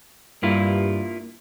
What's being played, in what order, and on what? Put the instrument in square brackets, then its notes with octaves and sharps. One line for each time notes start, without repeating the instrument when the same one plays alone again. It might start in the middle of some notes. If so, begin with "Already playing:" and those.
[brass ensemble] G2 [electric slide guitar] A#3 E4 F4